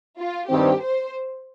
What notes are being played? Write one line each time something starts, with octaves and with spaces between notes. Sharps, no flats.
F4
G2 D#3 C4 G4
C5